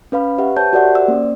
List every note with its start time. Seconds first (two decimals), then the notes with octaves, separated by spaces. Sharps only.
0.12 C#4 B4 F5 B5
0.38 G4 B4 E5 F#5
0.57 C5 C#5 A5 G6
0.73 F#4 G4 A#4 D5 E5 F#5
0.95 C5 D5 E6
1.08 A#3 C#4